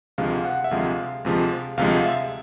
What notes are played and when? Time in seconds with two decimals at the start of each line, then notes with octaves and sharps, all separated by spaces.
0.18 D2 C3 F3 G#3 F5
0.45 F#5
0.64 E5
0.71 D2 C3 F3 G#3 F5
1.25 D2 C3 F3 G#3
1.77 D2 C3 F3 G#3 F5
2.05 E5